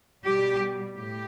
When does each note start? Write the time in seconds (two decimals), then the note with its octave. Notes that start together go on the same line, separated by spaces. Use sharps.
0.26 B2 G3 G4
0.96 A2 G4